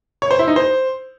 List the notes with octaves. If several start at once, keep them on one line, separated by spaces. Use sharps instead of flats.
C#5
C5
E4
D#4
C5